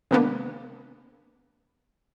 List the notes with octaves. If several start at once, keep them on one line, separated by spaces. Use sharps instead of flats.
C3 D#3 G#3 A#3 B3 D4